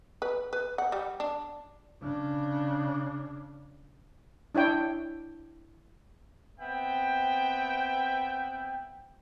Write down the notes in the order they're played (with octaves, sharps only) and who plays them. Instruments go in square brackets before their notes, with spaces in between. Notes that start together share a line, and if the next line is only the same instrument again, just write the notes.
[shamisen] B4
B4
F#5
G3
D4
[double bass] C#3 D4
[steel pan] D4 E4 C#5 G5
[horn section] B3 C4 E5 G5